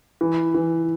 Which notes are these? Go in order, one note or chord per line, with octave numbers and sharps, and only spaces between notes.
E3
E3